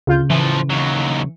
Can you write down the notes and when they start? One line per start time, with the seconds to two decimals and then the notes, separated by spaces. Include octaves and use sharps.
0.07 D2 C#3 F4 G6
0.30 A2 E3 F3
0.70 D#2 F#3